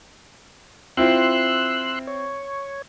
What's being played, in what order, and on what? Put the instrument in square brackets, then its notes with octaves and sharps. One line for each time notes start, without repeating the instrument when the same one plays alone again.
[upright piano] C4 E4 F4 [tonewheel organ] C6 E6 F#6
[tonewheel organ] C#5